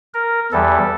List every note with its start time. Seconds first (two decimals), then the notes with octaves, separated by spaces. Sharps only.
0.14 A#4
0.52 E2 E3 G3 A4